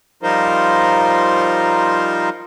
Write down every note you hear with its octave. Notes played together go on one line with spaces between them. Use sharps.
F3 G3 D#4 F4 A#4 C5